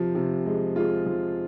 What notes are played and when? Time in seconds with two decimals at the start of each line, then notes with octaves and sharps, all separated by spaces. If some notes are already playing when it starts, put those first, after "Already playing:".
Already playing: C3 F3
0.15 C3
0.46 G#3
0.76 G#3 F4
1.06 F3